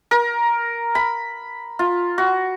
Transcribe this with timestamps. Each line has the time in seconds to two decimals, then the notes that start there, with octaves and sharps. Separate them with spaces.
0.11 A#4
0.95 B5
1.79 F4
2.18 F#4